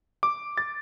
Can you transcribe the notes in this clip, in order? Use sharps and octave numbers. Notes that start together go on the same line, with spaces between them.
D6
A6